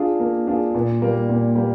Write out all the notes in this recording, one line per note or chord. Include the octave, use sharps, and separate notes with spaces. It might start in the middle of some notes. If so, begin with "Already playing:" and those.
Already playing: D4 F4 G#4
A#3
D4 F4 G#4
A#2
G3 A#3
A#2
G3 A#3